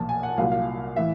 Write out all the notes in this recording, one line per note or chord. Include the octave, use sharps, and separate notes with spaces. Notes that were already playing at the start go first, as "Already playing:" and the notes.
Already playing: B1 A#2 F3 A5
G#5
F#5
C2 A#2 F#3 F5
F5
A2 E3 E5